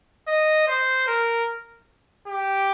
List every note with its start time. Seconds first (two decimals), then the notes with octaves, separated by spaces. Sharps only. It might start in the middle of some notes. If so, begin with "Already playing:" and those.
0.28 D#5
0.68 C5
1.07 A#4
2.28 G4